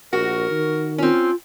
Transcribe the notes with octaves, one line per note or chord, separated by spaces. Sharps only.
A#1 F#4 A#4
D#3
C4 C#4 F4